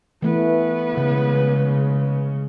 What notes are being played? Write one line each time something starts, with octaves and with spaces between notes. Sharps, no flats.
E3 A3 B3 B4
C#3 G#3